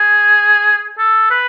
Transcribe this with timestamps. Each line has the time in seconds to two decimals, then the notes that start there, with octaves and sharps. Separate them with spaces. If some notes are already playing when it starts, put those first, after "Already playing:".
Already playing: G#4
0.98 A4
1.31 B4